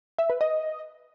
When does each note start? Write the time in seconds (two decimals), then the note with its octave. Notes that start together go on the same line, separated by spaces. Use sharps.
0.19 E5
0.30 B4
0.41 D#5